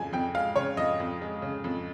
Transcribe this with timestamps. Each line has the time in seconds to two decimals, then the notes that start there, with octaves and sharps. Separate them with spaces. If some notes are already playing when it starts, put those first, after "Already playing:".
Already playing: F2 C#3 G#3 G#5
0.13 F2 G5
0.34 G#3 F5
0.56 C#3 C#5
0.77 F2 D#5
1.00 F2
1.22 G#3
1.42 C#3
1.64 F2